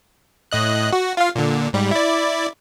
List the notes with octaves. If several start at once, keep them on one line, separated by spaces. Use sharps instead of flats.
A2 D#5 F#6
F#4
F4 F5
A#2 D3
G#2 G3
E4 D5